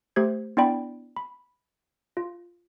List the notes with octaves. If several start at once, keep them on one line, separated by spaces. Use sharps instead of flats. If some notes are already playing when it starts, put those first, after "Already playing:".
A3 G4 C5 G#6
B3 D4 E4 D5 G5 B5
B5
F4